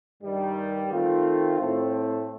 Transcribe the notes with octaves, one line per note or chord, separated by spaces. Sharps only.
G2 D#3 G3
D#3 A3 C4 F4
A2 A3 C4